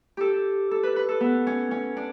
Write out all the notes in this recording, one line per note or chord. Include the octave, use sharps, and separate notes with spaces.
G4 A4
A4
B4
B4
A4
B3
C#4
C#4
D4